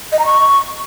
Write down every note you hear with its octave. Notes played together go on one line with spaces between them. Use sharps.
D#5
A#5
C#6